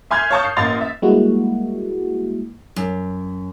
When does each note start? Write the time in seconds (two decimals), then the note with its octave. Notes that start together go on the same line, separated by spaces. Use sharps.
0.11 E5 G#5 C6 F6 G6 G#6
0.31 C#5 F5 A5 C#6 D#6 G6
0.45 C7
0.57 A1 A#3 D#5 C6 A6 F7
0.81 E5
1.02 G3 G#3 A#3 E4 F#4
2.76 F#2